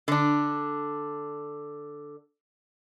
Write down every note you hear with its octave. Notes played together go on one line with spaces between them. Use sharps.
D3 D4